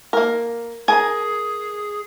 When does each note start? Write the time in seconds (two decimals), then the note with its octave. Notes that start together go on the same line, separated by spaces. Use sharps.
0.13 A#3 A#4
0.88 G#4 A#4 G#5 A#5